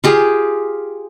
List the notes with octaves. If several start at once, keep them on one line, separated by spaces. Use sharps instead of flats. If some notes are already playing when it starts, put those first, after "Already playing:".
F4 G4 G#4